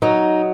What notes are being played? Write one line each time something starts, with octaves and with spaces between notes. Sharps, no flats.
F#3 D#4